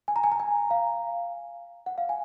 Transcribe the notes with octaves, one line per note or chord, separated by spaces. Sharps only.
G#5
A#5
G#5
A#5
G#5
F5
F#5
F5
G#5